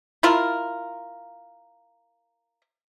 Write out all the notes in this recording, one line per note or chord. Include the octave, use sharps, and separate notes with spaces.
E4 F4 A#4